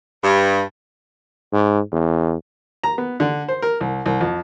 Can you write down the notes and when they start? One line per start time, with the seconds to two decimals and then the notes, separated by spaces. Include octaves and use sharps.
0.22 G2
1.53 G#2
1.92 E2
2.84 A#5
2.98 B3
3.20 D3
3.48 C5
3.62 A#4
3.81 C2
4.06 C2
4.21 F2